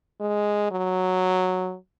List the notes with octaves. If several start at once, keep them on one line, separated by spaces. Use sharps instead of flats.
G#3
F#3